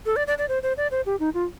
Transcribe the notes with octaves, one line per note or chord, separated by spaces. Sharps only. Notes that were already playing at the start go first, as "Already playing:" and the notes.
A4
D5
D5
D5
C5
C5
D5
C5
G4
D#4
F4